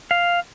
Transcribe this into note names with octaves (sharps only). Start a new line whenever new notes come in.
F5